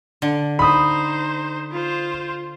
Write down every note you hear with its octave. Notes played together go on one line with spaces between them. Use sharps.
D3
D#4 C5 B5 D#6
F4 C5